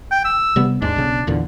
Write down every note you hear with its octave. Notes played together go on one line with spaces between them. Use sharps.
G5
E6
C3 G3 B3
D#2 G#2 G#3 D4
B1 C#3
E2 A#2 D3